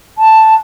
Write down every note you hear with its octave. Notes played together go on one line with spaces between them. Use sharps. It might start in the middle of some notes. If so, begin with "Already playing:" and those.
A5